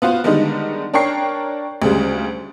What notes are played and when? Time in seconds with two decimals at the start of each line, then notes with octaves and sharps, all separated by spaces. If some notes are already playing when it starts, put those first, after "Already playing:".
0.02 B3 F4 F#4 C5
0.24 D3 D#3 G3 G#3 B3 D#4
0.94 D4 A#4 C#5 G5 C#6 C7
1.82 D2 C#3 G3 G#3